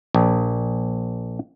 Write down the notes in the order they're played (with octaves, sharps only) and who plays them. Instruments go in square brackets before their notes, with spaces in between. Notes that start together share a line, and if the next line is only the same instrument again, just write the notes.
[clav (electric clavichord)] A#1